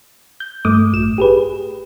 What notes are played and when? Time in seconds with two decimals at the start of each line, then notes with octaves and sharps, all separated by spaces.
0.40 G6
0.65 G2 A3 D6 D#6
0.93 A1 E7
1.18 G4 G#4 B4